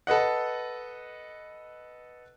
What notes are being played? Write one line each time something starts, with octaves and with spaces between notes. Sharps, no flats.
A4 B4 D#5 F#5